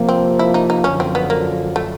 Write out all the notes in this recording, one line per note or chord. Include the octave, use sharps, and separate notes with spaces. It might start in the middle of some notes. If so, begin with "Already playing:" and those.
Already playing: C3 F3 A#3
C4
E4
D#4
D#4
F#2 D3 F3 C#4
C4
B3
A#3
A3